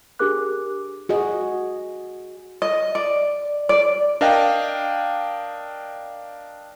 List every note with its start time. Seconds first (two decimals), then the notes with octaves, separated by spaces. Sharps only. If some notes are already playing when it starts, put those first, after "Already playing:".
0.19 D4 G4 G#4 A#4 D6 F#6
1.09 F#4 G#4 D#5
2.62 D#5
2.95 D5
3.69 D5
4.21 D4 A#4 D#5 F5 G5